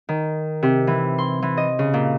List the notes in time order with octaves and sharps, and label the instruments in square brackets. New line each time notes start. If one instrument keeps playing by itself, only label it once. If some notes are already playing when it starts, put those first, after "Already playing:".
[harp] D#3
C3
E3
C6
E3
D#5
C#3
A#2